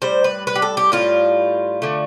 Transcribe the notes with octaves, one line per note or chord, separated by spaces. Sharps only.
A2 G3 C5
B4
B4
G4
A4
G4
A2 G3 F4
D3 A3